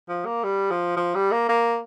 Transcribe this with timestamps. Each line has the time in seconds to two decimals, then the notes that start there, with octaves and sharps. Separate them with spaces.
0.09 F3
0.26 A#3
0.44 G3
0.70 F3
0.96 F3
1.15 G3
1.32 A#3
1.49 A#3